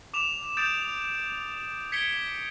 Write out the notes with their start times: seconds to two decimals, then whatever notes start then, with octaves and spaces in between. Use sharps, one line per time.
0.14 D6 E7 F7
0.57 D#6 G6 A6 D7
1.92 G#6 B6 C#7 D7 G7